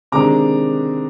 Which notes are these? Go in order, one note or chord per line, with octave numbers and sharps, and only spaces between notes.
C3 D#3 G#3 D4 A#5 D6